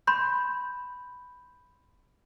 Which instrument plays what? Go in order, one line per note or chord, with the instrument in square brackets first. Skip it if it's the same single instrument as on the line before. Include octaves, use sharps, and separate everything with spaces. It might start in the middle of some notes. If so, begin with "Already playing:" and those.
[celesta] B5 C6 G6